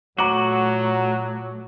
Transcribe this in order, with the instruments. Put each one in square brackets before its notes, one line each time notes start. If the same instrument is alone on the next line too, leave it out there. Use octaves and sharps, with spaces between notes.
[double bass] A#2 A3 [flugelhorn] F#3 [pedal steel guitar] F#4 [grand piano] A#5 D6 F#7